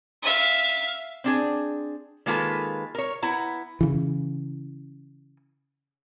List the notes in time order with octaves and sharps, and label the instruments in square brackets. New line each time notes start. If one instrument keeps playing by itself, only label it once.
[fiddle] E5 F5
[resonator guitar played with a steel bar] C4 D4 G#4
D#3 G#3 A#3 F4 A4 B4
A#4 C#5
B3 E4 A#5
[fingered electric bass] C#3 E3